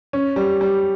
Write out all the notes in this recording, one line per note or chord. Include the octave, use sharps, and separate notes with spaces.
C#4
G3
G3